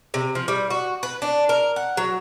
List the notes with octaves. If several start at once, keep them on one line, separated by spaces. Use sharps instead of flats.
C3
F3
G3
F#4
B4
D4
A#4
F#5
F#3